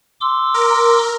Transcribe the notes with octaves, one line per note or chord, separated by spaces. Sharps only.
C6 D6 E6
A#4